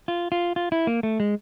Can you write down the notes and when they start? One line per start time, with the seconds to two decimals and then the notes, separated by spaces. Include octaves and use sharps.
0.08 F4
0.32 F4
0.56 F4
0.72 E4
0.87 A#3
1.03 A3
1.20 G#3